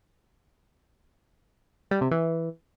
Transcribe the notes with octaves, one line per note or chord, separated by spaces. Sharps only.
G3
C3
E3